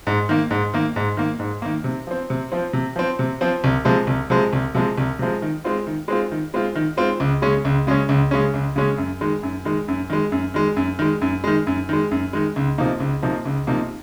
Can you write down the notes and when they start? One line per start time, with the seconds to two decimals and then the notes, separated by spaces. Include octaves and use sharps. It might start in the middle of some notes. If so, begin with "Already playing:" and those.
0.07 G#2
0.29 D#3 A#3
0.51 G#2
0.74 D#3 A#3
0.96 G#2
1.17 D#3 A#3
1.40 G#2
1.62 D#3 A#3
1.84 C3
2.07 F3 C4
2.30 C3
2.52 F3 C4
2.73 C3
2.96 F3 C4
3.19 C3
3.41 F3 C4
3.64 C2
3.85 C3 F3 G#3
4.07 C2
4.30 C3 F3 G#3
4.53 C2
4.75 C3 F3 G#3
4.98 C2
5.19 C3 F3 G#3
5.42 D#3
5.64 G#3 C4 F4
5.87 D#3
6.08 G#3 C4 F4
6.32 D#3
6.54 G#3 C4 F4
6.76 D#3
6.97 G#3 C4 F4
7.20 C#2
7.42 C#3 G#3 C#4
7.65 C#2
7.87 C#3 G#3 C#4
8.09 C#2
8.31 C#3 G#3 C#4
8.54 C#2
8.76 C#3 G#3 C#4
8.98 F#2
9.21 D#3 G#3
9.43 F#2
9.65 D#3 G#3
9.88 F#2
10.10 D#3 G#3
10.32 F#2
10.54 D#3 G#3
10.77 F#2
10.99 D#3 G#3
11.22 F#2
11.44 D#3 G#3
11.67 F#2
11.89 D#3 G#3
12.11 F#2
12.33 D#3 G#3
12.56 C#2
12.78 C3 F3 A#3 D#4
13.00 C#2
13.23 C3 F3 A#3 D#4
13.45 C#2
13.67 C3 F3 A#3 D#4